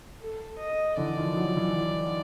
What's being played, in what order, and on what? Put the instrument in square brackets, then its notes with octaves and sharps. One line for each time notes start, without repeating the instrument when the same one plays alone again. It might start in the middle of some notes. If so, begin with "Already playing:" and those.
[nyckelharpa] A4
D#5
[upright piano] D3 E3 [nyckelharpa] D5
[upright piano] D#3 F3
E3 F#3
E3 F#3